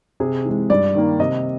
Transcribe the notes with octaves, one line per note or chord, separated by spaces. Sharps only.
C3 G#4
E3 G#3
G2 D5
D#3 G3 A#3
C3 D#5